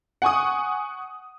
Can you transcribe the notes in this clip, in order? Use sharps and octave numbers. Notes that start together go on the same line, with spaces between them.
F#5 G#5 C#6 D#6